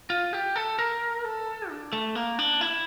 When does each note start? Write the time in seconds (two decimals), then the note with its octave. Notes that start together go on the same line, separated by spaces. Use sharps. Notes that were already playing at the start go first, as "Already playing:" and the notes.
0.10 F4
0.33 G4
0.56 A4
0.79 A#4
1.25 A4
1.69 D4
1.93 A3
2.15 A#3
2.39 D4
2.61 E4